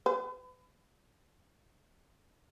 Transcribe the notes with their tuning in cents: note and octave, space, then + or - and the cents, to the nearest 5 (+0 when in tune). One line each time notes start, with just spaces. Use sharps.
B4 +35